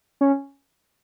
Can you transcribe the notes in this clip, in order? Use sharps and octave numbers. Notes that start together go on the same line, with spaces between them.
C#4